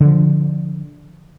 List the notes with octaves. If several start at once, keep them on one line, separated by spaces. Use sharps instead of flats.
D3 F3